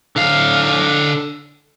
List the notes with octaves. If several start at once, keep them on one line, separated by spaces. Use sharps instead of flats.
D3 F5